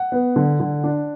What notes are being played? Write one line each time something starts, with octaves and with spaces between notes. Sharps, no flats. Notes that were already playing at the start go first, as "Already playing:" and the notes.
Already playing: F#5
B3
D3
D3
D4